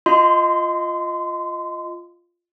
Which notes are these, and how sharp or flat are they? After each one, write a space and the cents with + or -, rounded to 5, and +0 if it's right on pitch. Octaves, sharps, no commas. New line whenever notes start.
F4 +0 D#5 +5 C6 -25